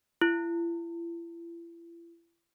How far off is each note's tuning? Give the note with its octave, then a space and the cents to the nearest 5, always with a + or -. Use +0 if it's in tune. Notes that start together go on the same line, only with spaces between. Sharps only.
E4 +40